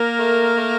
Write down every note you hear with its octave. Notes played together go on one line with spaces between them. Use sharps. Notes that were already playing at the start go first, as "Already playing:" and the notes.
Already playing: A#3 A#4
A3
A3